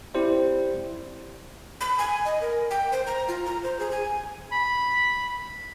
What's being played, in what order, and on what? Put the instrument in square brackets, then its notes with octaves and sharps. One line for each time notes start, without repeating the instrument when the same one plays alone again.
[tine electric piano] C4 E4 G4 C5 D5
[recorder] B5
G#5
D#5
A#4
G5
C5
A#5
F4
A#5
C5
G#4
G#5
[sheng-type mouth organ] B5